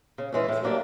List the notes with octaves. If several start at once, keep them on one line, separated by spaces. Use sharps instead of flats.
C#3
E3 G#3 C#4
A2
F#3 A#3 D4 G4